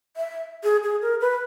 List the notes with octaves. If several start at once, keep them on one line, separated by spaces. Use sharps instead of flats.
E5
G#4
G#4
A#4
B4